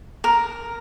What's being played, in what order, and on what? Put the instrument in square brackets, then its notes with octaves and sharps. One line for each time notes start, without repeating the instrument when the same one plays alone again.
[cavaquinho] A#4